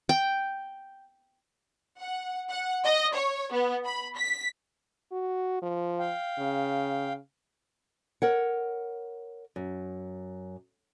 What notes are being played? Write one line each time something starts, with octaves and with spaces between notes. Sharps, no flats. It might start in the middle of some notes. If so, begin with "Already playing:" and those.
G5
F#5
F#5
D#5
C#5
B3
B5
B6
F#4
F3
F5 G5
C#3
A#4 C#5 F#5
F#2